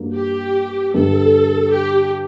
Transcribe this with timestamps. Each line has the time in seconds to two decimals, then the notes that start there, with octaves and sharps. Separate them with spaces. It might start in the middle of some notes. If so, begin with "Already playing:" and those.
Already playing: G2 F#3 A#3 D4
0.15 G4
0.94 G2 D3 G3 A4
1.73 G4